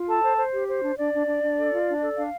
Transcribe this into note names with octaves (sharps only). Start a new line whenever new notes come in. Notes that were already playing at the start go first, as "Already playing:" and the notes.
Already playing: F4
A4 A5
C5
C5
G4
C5
D4
D4 D5
D4
D4
D4
A4
F4
D4
A4
D4 F5